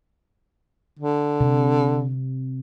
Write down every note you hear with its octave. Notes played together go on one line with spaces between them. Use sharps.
D3
C3